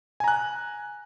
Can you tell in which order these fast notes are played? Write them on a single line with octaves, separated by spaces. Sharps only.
G#5 A#5 F#6